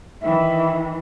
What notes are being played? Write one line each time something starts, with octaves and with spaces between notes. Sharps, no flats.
D#3 E3 E5